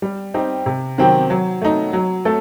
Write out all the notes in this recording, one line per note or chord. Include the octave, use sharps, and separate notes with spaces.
G3
C4 D#4 G4
C3
D#3 F#3 C4 G4
F#3
A3 D#4
F#3
A3 A4